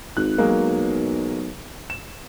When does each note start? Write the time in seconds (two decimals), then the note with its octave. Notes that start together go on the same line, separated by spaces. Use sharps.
0.17 G#1 F#6
0.38 B1 F#3 G#3 A#3
1.90 E7